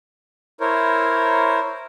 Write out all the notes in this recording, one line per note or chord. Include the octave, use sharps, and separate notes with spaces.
E4 A#4 C5 C#5